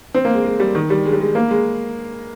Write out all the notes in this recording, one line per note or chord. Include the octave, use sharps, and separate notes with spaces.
C4
A#3
G#3
G#3
G3
D#3
G3
G#3
G3
G#3
A#3
G#3